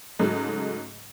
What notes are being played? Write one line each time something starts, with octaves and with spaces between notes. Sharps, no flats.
G#2 C#3 F#3 G#3 A3